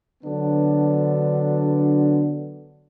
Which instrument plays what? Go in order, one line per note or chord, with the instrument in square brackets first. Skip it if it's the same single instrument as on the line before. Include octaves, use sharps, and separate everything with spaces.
[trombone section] D3 F#3 B3 D4